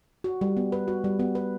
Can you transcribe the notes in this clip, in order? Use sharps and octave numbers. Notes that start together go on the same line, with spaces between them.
F#4
G3
B3
B4
F#4
G3
B3
B4